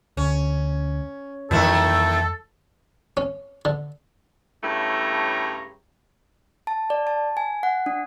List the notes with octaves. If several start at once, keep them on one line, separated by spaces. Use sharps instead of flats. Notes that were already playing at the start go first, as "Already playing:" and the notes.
D2 C#4
F2 A#2 D#3 E3 G3 E4 A4
C#4
D3
G2 C#3 A3 E4 C#5 A#5
A5
D5
A5
G#5
F#5
D4